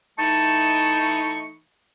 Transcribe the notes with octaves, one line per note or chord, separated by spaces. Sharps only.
E3 A3 D#4 A5 C#6